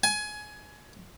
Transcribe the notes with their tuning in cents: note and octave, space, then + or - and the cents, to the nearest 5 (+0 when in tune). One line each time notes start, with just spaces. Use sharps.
G#5 +20